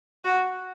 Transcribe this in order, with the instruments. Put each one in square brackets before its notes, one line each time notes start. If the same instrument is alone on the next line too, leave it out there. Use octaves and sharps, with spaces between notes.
[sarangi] F#4